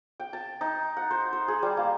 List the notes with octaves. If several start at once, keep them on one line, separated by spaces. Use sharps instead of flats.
G5
A5
D#4
F#5
C5
C5
G#4
G3
A#3